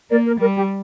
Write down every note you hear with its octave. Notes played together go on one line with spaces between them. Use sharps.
A#3 A#4 D5
A#4
G3 A#4
G4